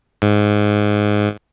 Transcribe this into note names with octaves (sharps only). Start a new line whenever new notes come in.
G#2